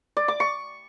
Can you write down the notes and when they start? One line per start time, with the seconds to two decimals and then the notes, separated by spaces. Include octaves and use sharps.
0.17 D5
0.28 D6
0.40 C#6